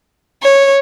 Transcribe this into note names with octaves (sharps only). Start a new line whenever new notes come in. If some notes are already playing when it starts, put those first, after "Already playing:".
C#5